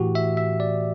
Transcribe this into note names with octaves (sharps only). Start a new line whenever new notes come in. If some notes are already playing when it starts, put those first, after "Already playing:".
Already playing: A2 E3 F#4 G4
E5
E5
D5